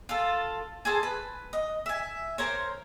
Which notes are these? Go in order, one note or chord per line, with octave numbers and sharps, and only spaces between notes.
F4 A4
G#4 A4 C5
B4
D#5
E5 G#5
A#4 C5 C#5